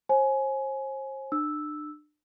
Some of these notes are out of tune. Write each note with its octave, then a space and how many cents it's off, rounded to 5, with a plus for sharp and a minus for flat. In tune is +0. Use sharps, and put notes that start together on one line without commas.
C5 +40 G#5 +20
D4 +35 E6 +0